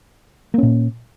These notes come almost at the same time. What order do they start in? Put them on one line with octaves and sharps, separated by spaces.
A#3 C#4 A#2